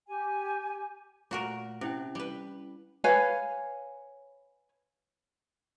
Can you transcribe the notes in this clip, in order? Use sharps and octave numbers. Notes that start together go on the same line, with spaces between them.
G4 G#5
A#2 A3 F#4 A#4
C3 C#4 E4 G5
G3 B4
B4 C#5 F5 G#5